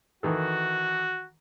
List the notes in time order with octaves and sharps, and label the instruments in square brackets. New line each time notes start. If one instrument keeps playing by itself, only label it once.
[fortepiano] D#3 E3 A4 [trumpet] F#4